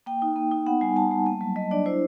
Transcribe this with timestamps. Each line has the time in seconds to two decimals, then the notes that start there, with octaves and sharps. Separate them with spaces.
0.06 A#3 G5
0.22 D#4
0.36 A#3
0.51 D#4
0.66 B3 F#5
0.81 G3 G#5
0.96 G3 A5
1.11 G3
1.26 A#3
1.41 F#3
1.56 F#3 D#5
1.71 D4 D5
1.86 E4 C5